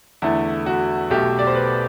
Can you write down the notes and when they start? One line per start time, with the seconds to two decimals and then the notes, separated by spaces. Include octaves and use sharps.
0.22 E2 D3 A3 E4
0.66 F#4
1.10 B1 B2 A3 G4
1.39 D5
1.47 C5
1.55 B4